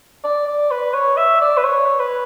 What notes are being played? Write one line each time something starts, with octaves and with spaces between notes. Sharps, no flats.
D5
D5
B4
C#5
E5
D5
B4
C#5
B4